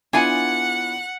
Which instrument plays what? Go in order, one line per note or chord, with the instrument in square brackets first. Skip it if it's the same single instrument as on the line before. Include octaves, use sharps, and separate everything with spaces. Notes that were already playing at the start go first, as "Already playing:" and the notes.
[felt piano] B3 E4 F4 [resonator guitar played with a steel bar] D4 G#5 [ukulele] G#4 [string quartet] F#5 F#6